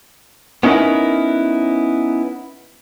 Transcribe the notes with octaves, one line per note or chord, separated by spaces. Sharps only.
B3 C#4 D#4 E4 A#4 B4